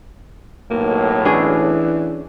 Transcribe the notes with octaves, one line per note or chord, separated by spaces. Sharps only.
B1 A2 A#3
E3 C#4 D4 G#4